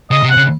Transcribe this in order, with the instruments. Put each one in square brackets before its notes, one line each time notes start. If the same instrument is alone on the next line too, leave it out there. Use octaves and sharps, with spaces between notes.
[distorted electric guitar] C#3 [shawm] D#5
[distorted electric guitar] C3
[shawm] F#5
[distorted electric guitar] C#3